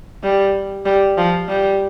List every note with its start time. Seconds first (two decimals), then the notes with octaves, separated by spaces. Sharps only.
0.23 G3
0.85 G3
1.18 F3
1.49 G3